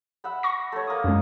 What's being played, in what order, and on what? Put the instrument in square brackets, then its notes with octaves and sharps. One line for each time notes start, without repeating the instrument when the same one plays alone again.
[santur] E5 F#5 B5
[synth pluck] C#6 A#6
[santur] A3 C#5
A#3 D#6
[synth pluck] F#2 G#3